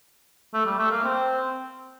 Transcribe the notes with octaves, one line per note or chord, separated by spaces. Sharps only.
A3
G3
A3
A#3
C4